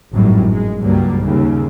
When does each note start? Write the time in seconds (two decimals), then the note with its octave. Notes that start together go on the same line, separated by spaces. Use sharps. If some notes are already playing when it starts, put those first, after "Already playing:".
0.14 G#1 F#2 A2 G3
0.50 G#3
0.80 C#2 G2 F#3 G3 A#3
1.21 D#2 C#3